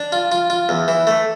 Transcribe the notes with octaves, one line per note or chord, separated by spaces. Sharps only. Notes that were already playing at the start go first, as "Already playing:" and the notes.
Already playing: D4
F4
F4
F4
E2
E3
A3